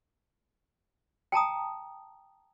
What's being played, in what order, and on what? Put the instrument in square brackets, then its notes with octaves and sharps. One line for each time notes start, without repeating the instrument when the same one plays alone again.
[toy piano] G5 A5 A#5 D#6